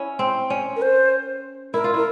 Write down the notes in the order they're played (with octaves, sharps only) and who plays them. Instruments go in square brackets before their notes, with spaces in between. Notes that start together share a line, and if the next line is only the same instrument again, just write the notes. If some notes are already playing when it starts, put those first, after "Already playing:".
Already playing: [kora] C#4 E4
C4
C#4
[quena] A#4
C5
[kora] E4 [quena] A#4
[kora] F4
[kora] E4 [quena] A#4